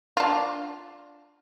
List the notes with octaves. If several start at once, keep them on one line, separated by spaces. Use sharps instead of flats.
D4 F4